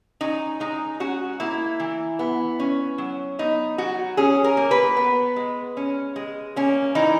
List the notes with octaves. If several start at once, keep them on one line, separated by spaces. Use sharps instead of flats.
C#4 D#4
G#3 D#4
C#4 F#4
A#3 E4
E3
B3
C#4
F#3
B3 D#4
F#3 F#4
C#4 G#4
A#4
A#3
B4
B3
G#3
C#4
G#3
A#3 C#4
E3 D#4